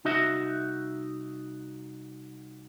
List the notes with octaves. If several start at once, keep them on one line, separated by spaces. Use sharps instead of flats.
C2 D#4 F#4 D#5 E5